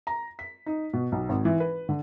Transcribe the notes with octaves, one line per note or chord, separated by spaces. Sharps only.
A#5
B6
D#4
B2
B1
G#1
E3
B4
D3